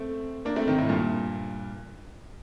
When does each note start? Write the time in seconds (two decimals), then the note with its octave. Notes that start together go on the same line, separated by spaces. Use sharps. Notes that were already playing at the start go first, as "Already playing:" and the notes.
Already playing: A3 C4
0.45 A#3 D4
0.56 A3 C4
0.67 C3 D#3
0.78 A2 C3
0.89 G2 A#2